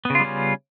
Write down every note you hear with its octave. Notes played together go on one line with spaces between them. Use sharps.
C#3 G3 B3 C#4 F4